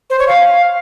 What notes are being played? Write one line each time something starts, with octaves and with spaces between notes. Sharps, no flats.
C5
C#5
F5